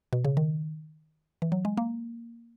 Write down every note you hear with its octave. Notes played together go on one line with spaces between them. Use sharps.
B2
C#3
D#3
E3
F#3
G#3
A#3